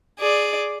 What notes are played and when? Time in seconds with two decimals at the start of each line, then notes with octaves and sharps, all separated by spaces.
0.19 G#4 D5